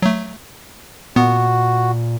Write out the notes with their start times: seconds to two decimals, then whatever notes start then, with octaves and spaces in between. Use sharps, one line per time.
0.02 F#3 A3
1.16 A#2 B3 F#4